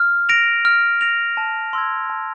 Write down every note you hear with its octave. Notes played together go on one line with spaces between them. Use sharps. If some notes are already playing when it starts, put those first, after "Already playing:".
Already playing: F6
A#6 D7 F7
F6
A#6 D7 F7
A5
C6 E6 G#6
A5